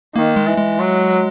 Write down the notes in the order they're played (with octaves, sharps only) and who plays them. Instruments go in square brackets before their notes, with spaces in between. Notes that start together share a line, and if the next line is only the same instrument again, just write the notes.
[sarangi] D#3 [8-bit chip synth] A#3
[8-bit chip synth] G#3
[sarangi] E3
[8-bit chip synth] G#3
[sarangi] F#3